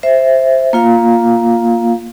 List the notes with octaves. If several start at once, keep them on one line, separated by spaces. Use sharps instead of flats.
C5 E5
A#3 F4 F5